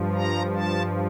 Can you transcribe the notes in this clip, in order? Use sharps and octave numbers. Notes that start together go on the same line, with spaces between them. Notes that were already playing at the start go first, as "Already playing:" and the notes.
Already playing: G2 F3
A#5
A5